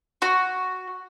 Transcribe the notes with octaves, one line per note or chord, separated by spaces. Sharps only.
F#4